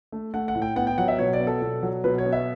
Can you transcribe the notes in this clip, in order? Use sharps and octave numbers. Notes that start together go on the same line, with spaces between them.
A3
A3 F#5
F#5
A2
G5
B3 F#5
G5
F#3 F#5
E5
B2 C#5
D5
B3
A4
B2
F#3
B2 B4
C#5
B3
E5